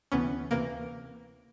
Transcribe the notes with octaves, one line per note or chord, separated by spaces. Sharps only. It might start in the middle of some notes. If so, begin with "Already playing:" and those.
D2 C3 E3 B3 C#4
D2 C3 E3 A#3